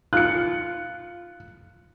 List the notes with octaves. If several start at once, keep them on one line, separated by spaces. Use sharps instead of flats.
F4 F#6 C#7